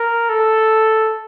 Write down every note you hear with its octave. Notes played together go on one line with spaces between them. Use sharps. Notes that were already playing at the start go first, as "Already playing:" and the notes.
Already playing: A#4
A4